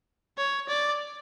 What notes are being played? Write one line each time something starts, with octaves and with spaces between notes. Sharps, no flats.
C#5
D5